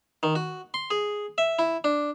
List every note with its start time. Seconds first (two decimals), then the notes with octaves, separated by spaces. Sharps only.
0.23 D#3
0.35 F#4
0.74 C6
0.91 G#4
1.38 E5
1.59 E4
1.84 D4